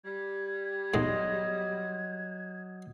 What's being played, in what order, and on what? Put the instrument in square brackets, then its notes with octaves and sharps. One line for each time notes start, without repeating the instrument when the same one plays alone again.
[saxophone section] G3 [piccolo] G#6
[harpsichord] E2 G#2 [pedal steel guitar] F#3 D#5 C6